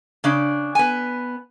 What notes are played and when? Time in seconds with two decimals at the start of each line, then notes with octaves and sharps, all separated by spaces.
0.24 C#3 D4
0.75 B3 G#5